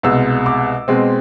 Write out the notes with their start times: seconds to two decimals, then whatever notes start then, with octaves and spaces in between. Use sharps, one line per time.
0.03 C2 B2 G#3 E6
0.46 D6
0.88 B2 G#3 C4